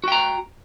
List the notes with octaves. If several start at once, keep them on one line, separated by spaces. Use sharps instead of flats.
F#4 G5 A#5